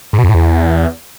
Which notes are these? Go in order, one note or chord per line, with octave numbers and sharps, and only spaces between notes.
G#2
B2
F2
A2
E2